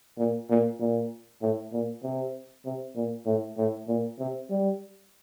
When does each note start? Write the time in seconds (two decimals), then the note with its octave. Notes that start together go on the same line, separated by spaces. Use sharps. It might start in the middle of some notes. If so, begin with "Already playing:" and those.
0.18 A#2
0.49 A#2
0.79 A#2
1.41 A2
1.72 A#2
2.03 C3
2.65 C3
2.96 A#2
3.26 A2
3.57 A2
3.88 A#2
4.18 C3
4.50 G3